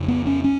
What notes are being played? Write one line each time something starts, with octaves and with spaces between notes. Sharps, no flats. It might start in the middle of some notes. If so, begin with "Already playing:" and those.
Already playing: F2 C#3
B3
C#4
C#4